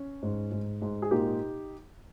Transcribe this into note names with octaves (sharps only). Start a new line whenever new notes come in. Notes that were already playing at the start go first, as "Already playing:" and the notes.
Already playing: C#4
G#2
G#2
G#2
G#4
A#2 D#4 G4